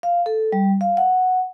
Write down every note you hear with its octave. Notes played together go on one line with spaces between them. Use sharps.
F5
A4
G3
F5
F#5